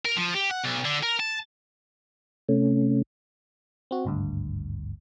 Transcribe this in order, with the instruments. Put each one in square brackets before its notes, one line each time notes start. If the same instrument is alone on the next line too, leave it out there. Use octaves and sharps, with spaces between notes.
[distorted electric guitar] A#4
F3
G4
F#5
B1
D3
A#4
A5
[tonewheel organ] C3 A3 C#4
[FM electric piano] C4 F#4
G#1 D2 G2